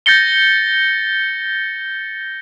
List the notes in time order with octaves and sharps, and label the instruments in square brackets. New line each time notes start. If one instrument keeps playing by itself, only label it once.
[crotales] G6 A6 A#6 C#7 G7